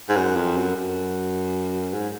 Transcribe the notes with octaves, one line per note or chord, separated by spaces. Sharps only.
G#2
F#2
F2
F#2
F#2
G#2